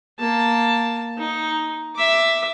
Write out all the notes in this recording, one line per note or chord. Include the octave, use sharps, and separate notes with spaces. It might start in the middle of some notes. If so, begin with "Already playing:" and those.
A#3 A5
D#4
E5 D6